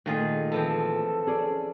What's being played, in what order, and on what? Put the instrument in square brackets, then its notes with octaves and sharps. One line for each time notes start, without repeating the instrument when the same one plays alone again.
[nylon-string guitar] A#2 A3 [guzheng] D#3 F4 G#4
[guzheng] E3 F3 C4 [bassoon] A4
[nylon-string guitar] C#4 G#4 D5